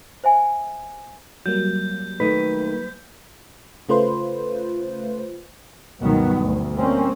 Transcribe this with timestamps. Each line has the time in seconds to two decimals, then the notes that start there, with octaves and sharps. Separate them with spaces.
0.24 C5 E5 G#5
1.46 F#3 G3 A#3 G6
2.20 D#3 A3 D#4 B4
3.89 C#3 A3 F4 B4 C5
6.01 C#2 G2 B2 D#3 F#3 B3
6.39 D2
6.76 G3 A#3 C4 C#4